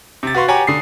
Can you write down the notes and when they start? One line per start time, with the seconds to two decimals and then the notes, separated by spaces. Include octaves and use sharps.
0.23 C3 A6
0.35 F#4 B4 F5 C6 C#6
0.48 G4 C#5 F#5 G#5 A#5 D6
0.67 D3 D#6 C7